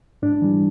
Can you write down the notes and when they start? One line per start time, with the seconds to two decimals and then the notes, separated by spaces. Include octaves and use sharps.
0.22 G#2 D4
0.42 E3 G3